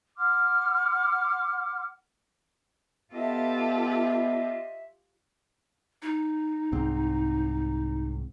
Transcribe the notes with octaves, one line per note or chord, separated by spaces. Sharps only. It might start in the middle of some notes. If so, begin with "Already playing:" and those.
F#5 C6 D6 F6
B3 F4 G4 A4 D#5 E5
D#4
C2 G#2 C4